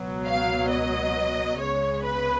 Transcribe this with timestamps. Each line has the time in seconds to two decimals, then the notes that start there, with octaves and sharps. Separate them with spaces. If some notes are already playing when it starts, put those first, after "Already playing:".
Already playing: C#2 B2 F#3 B3
0.26 F5
0.70 D#5
1.60 C#2 C#3 G#3 B3 C#5
2.05 B4